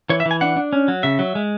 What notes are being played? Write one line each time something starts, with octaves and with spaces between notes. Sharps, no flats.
E3 C#5
E5
E3
G#5
D4 F#5
D4
C#4
F#3
C#3 E5
F#3
G#3